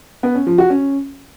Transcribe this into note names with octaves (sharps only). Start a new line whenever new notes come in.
B3
C#4
F3
F#4
C#4